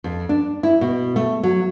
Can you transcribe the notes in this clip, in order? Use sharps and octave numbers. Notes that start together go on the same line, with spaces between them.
F2
D4
E4
B2
A3
F#3